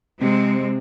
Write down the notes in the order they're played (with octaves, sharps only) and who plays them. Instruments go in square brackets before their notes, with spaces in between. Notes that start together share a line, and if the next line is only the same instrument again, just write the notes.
[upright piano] C3 [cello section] G#3 C4